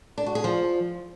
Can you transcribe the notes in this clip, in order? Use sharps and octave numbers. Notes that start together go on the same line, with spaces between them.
D4
F#4
G#4
F3